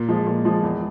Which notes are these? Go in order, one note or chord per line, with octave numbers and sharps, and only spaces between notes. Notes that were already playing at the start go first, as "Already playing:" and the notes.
Already playing: A#2
F3 G#3
A#2
F3 G#3
E2